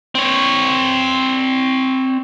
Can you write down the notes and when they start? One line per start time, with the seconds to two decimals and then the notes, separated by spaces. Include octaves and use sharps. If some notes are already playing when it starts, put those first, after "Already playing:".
0.15 C4 C#5